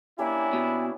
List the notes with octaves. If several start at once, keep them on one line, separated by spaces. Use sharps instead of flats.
A#3 C#4 D4 E4 G4 G#5
B2